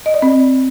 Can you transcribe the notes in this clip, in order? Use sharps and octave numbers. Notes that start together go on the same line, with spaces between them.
D#5
D5
C4